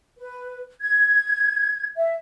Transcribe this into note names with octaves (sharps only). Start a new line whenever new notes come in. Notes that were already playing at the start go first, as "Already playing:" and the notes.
B4
G#6
E5